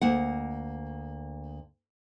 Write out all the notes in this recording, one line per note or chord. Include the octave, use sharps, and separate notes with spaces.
D2 A#3 F#5